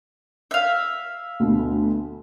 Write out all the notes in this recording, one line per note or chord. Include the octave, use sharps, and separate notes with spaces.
E5 F5
D2 B2